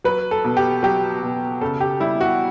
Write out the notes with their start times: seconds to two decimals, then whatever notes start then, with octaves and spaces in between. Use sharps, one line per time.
0.04 F#3 B4
0.31 A4
0.44 B2
0.57 G4
0.83 F#3 G4
1.22 B2
1.61 C#3 A4
1.81 G4
2.00 G3 E4
2.21 F#4